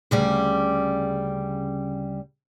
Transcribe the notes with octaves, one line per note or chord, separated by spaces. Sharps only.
D2 C#3 G3